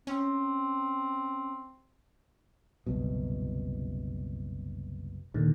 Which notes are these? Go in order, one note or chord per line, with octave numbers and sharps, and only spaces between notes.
C4 C#4
F#1 C2 B2
D#2 A#2 D3 D#3